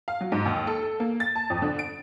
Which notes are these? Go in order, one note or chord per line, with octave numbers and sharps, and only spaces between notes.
F5
F#3
G#2
D#2
A4
A4
A#3
A6
A5
F2
D3
D7